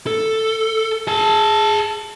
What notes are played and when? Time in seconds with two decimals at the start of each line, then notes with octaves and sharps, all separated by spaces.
0.07 A4
1.07 G#4 A5